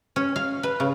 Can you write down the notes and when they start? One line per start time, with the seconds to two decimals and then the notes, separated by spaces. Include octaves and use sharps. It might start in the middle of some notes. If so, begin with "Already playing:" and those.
0.16 C#4
0.36 F5
0.63 B4
0.80 C#3